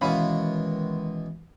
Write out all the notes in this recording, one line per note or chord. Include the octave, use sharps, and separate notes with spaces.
B2 D#3 E3 G#3 C#4 F5 B5